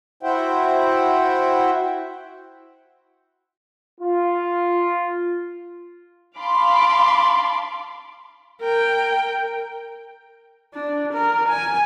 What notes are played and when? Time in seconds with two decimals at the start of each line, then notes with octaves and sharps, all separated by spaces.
0.23 E4 F#4 C5 E5 F#5 G5
3.99 F4
6.37 F5 A5 B5 C6 D6
8.61 A#4 G5
10.74 D4
11.13 A#4
11.48 G#5